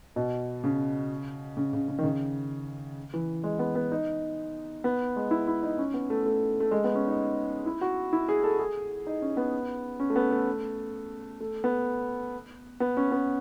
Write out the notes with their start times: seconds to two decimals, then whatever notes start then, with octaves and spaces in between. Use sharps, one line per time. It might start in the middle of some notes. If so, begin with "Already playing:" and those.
0.16 B2
0.64 C#3
1.57 C#3
1.73 C#3
1.88 C#3
1.98 D#3
2.03 C#3
3.14 E3
3.44 G#3
3.59 B3
3.75 B3
3.92 D#4
4.84 B3
5.16 G#3
5.31 E4
5.48 E4
5.63 D#4
5.78 C#4
5.94 B3
6.10 A3
6.25 A3
6.60 A3
6.71 G#3
6.84 B3
6.95 C#4
7.07 D#4
7.66 E4
7.81 F#4
8.13 E4
8.29 G#4
8.44 A4
8.59 G#4
9.07 D#4
9.22 C#4
9.37 B3
10.00 C#4
10.10 A3
10.16 B3
10.31 A3
11.40 A3
11.64 B3
12.80 B3
12.97 C#4
13.12 B3